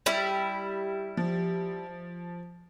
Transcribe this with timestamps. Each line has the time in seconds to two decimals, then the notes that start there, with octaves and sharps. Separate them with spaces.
0.06 G3 E4
1.17 F3